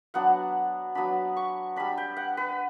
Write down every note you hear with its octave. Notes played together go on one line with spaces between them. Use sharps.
F#3 B3 D4 F#5
F#3 B3 D4 B5
C#6
G3 D4 B5
G5
F#5
B4